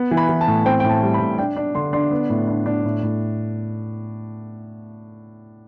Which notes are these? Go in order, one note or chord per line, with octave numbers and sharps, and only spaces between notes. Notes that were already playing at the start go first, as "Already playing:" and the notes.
Already playing: B3
E3
B5
E3
A5
A2
C4 G5
A2 G5
A5
G3
B5
A2
D4 G5
D4
D3 C6
D4 C6
B3
A2
D4
D4
A2
A2